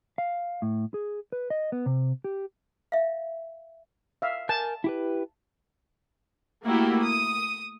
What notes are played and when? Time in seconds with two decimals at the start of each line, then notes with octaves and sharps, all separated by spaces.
0.18 F5
0.62 A2
0.94 G#4
1.32 B4
1.50 D#5
1.72 B3
1.86 C3
2.24 G4
2.92 E5 F5
4.22 E5 F5
4.49 A#4 G#5 A5 G6
4.84 E4 G4 B4
6.65 A3 A#3 E4 F#4 G4
7.03 D#6